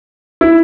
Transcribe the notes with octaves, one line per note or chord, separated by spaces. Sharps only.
E4